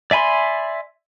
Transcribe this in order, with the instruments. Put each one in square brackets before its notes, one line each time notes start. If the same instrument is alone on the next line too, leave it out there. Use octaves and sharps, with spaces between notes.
[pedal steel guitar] D5 E5 G#5 B5 C6